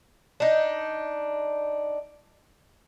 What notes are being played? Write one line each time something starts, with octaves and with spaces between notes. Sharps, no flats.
D4 D#4